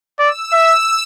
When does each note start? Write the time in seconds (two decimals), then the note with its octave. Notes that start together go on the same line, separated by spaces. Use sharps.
0.18 D5 E6
0.52 E5